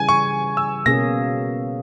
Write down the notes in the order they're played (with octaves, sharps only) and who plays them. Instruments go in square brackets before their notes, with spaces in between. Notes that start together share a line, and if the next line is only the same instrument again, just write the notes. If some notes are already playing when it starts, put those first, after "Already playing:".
Already playing: [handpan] C#3 E3 G3 [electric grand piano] G#5
[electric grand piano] C#6
E6
[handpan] B2 A#3 C#4 G#4 [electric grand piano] A#6